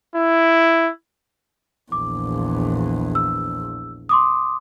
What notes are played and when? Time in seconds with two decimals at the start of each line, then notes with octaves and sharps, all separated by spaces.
0.16 E4
1.92 A#1 E2 D6
3.15 E6
4.09 C6 D6 D#6